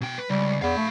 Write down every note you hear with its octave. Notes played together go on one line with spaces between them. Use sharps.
B2 G5
B4
C#2 G3
E2 F5 B5
A3